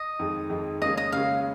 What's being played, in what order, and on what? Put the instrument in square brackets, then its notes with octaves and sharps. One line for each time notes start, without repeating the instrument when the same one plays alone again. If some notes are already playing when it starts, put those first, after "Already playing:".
Already playing: [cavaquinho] D#5
[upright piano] F2 D#3 G#3
F2 D#3 G#3
[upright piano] C#2 C#3 A#3 C#4 G#4 [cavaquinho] D#5
[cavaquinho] D#5
[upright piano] C#2 C#3 A#3 C#4 G#4 [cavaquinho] F5